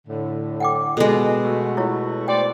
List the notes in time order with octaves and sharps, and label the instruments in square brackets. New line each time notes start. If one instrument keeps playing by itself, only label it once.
[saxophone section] A2 D3
[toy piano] F#5 G5 D6
[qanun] B2 G#3 [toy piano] A4
[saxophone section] A3 F#4
[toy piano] E4 F4 C#5
[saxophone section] C5 D5 [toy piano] G5